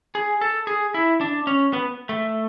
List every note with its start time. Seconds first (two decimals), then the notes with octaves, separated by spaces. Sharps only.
0.15 G#4
0.41 A4
0.67 G#4
0.94 E4
1.21 D4
1.47 C#4
1.73 B3
2.09 A3